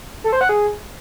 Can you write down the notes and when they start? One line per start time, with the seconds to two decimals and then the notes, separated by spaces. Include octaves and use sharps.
0.24 A4
0.33 C5
0.41 F#5
0.49 G#4